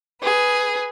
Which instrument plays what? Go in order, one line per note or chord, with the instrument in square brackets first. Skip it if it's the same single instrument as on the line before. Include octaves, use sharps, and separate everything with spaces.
[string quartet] G#4 B4